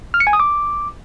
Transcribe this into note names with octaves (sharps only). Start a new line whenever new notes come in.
F6
C#7
G#5
D#6
D6